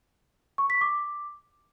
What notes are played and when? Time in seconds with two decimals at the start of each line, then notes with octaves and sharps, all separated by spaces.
0.58 C#6
0.70 B6
0.81 D6